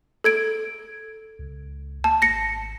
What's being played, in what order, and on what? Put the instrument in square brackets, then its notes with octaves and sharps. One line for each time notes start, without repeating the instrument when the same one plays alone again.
[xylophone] A4 G#6 D7
[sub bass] C#2
[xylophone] A5
[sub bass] G#1 [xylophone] A#6 C#7